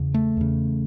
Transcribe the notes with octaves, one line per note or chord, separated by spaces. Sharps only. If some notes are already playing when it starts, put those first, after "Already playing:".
Already playing: E2 C#3
A3
E2 C#3